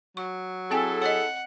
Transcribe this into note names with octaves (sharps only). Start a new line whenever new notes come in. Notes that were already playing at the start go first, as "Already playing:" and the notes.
F#3 C#6
C4 E4 G#4 A4 G5 G#5
C#5 D#5 F#5